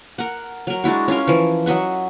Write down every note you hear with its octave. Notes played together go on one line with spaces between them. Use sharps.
A#4 F#5
F#3 A#4
G#3 D4 E4 F#4
C#4 F4 A#4
E3 F3
F#3 D#5 E5 F#5